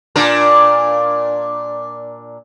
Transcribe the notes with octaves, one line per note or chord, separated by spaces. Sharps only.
A#2 D4 A#4